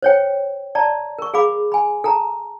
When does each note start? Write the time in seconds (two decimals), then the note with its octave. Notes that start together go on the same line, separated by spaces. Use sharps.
0.03 C5 C#5 G5
0.75 D5 A5 A#5
1.19 A#4 C#6
1.34 G#4 F5 B5 D6
1.72 G#5 B5
2.04 A4 A5 A#5